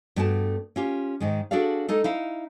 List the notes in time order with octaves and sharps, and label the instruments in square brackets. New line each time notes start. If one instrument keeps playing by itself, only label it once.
[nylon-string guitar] G2 A3 B3 F#4 G5 A5
C#4 F4 G4
G#2 D#3 G#3
D4 F#4 G#4 A4 D5 F5
G#3 D#4 A4
D#4 E4 F5